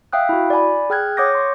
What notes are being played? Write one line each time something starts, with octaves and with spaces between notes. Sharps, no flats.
E5 F5 G5 D#6 F#6
E4 F#4
D5 F#5 G#5 B5
G#4 G5 F6 F#6 G#6
C#5 F#5 D6 D#6 G6 A#6
C6 C#6